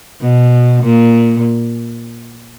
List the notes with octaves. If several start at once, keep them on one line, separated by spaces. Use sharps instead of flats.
B2
A#2